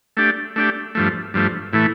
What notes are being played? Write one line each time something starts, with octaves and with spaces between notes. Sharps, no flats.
A3 D4 G4
A3 D4 G4
G2 F3 A3
G2 F3 A3
A2 E3 A3